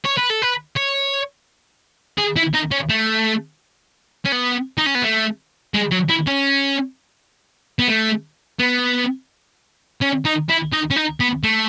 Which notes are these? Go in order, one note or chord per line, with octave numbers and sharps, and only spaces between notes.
C#5
B4
A4
B4
C#5
G#4
E4
D#4
C#4
A3
C#4
B3
D#4
C#4
B3
A3
G#3
F#3
E4
C#4
B3
A3
B3
C#4
D#4
E4
D#4
C#4
D#4
B3
A3